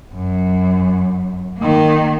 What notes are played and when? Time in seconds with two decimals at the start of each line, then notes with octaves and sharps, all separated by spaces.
0.14 F#2
1.59 D#3 A#3